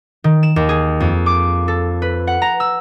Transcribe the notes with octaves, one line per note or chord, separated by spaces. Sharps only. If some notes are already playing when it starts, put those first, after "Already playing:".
D#3
E7
D#2
G#4
F2
D6
A4
B4
F#5
A#5
E6